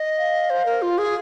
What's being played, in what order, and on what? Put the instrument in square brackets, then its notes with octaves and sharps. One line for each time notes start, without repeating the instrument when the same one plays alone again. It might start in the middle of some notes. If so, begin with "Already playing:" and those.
Already playing: [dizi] D#5
[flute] F5
[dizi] C5
A#4
F4
G#4